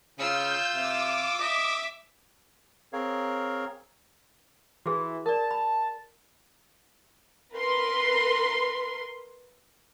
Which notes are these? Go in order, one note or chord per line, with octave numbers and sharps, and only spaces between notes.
C#3 F4 E6 G6
C3 D6
D#5 E5
C4 G#4 A#4 C#5 F5
E3 F#4 G#4
A#4 D5 A5
B5
A#4 B4 C6